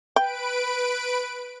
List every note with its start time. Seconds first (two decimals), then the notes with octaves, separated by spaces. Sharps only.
0.16 B4 G5 D7